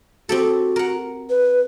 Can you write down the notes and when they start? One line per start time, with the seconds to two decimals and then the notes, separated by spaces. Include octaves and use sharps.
0.29 C4 F#4 G4 A4
0.76 A#4 F#5
1.30 B4